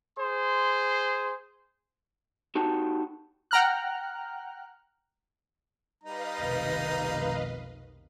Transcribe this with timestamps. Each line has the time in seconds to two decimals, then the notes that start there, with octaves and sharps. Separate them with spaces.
0.18 G#4 C5 C6
2.55 D#4 F#4 G4 C#5 A5
3.51 F#5 G5 A#5 F6 F#6
6.04 G3 D#4 B4 D#5 F5 A#5
6.39 F1 B1 D#3